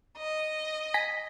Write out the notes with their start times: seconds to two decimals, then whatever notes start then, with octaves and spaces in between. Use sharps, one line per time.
0.17 D#5
0.94 G#5 A#6 B6